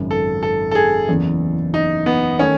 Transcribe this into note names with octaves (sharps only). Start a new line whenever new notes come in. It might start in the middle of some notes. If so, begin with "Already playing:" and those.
Already playing: G#1 F#2 C#3
A4
A4
A4
G#4
F#1 E2 C#3 E3
D#4
B3
D#3 A3 C#4